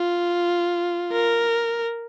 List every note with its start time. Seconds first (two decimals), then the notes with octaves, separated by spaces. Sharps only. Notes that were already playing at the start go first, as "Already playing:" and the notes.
Already playing: F4
1.12 A#4